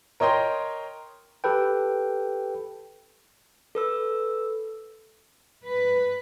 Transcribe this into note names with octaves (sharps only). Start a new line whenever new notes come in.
A#4 C#5 D#5 G5 C6
G4 A4 B4 G5
A4 B4 E6
B4